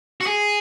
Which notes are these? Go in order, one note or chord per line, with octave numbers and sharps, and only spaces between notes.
F#4
G#4